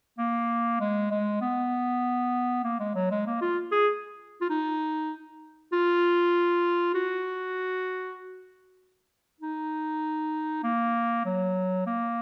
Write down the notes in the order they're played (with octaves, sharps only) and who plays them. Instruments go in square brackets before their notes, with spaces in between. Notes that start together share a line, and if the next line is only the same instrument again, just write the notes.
[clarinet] A#3
G#3
G#3
B3
A#3
G#3
F#3
G#3
A#3
F4
G#4
F4
D#4
F4
F#4
D#4
A#3
F#3
A#3